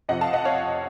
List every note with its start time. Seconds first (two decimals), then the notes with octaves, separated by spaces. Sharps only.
0.09 F2 C3 F3 D#5 F#5
0.21 F5 A5
0.33 D#5 F#5
0.45 C#5 F5